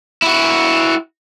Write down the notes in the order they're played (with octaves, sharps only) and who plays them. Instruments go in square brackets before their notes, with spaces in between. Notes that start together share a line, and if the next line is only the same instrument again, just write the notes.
[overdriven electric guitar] E4 F#4